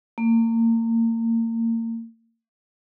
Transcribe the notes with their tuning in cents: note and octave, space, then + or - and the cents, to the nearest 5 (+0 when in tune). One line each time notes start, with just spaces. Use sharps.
A#3 -35